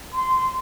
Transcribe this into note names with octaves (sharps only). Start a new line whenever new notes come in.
C6